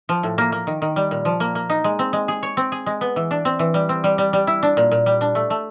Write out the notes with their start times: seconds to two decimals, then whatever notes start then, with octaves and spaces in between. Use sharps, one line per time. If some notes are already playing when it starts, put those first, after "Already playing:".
0.09 F3
0.23 A2
0.38 A#3
0.52 A#3
0.67 D#3
0.82 D#3
0.96 G3
1.11 A#2
1.25 F3
1.40 A#3
1.55 A#3
1.70 D#4
1.84 G#3
1.99 C4
2.13 G#3
2.28 G#4
2.43 C#5
2.57 C4
2.72 G#4
2.86 G#3
3.01 B3
3.16 E3
3.31 D4
3.45 C4
3.59 E3
3.74 G3
3.89 C4
4.04 G3
4.18 G3
4.33 G3
4.47 E4
4.63 D4
4.77 A#2
4.91 A#2
5.06 G3
5.21 D4
5.35 A3
5.50 A3